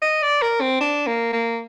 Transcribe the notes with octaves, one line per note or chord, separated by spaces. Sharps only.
D#5
D5
A#4
C4
D4
A#3
A#3